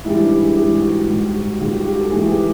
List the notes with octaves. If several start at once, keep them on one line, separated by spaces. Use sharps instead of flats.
G#2 E3 G3 E4
D4
G#4
G#2 E3 G3 G4
F#4
G#2 D#3 G3
F#4
G#2 D#3 G3 F4
F#4
G4
A4
G#2 E3 A3 G#4
G4